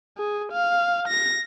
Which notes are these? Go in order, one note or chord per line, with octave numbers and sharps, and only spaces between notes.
G#4
F5
A#6